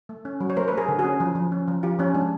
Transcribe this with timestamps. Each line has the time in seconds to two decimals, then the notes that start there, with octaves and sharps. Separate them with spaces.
0.09 A3
0.25 C#4
0.40 F#3
0.50 C#5
0.57 A3 A#4 C5
0.68 A3 B4
0.78 G#4 A#4
0.88 D3
0.99 F#4 G#4
1.04 C#4
1.20 F3
1.35 F3
1.52 C#4
1.68 F3
1.83 F3 F4 G4
1.99 F3 C#4
2.15 G#3 D4